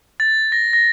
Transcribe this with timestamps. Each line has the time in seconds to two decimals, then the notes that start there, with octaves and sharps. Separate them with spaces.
0.20 A6
0.52 A#6
0.73 A#6